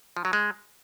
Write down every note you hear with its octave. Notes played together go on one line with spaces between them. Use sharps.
F3
F#3
G#3